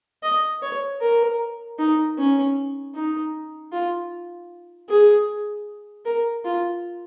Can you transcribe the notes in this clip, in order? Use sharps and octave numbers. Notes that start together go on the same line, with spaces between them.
D#5
C#5
A#4
D#4
C#4
D#4
F4
G#4
A#4
F4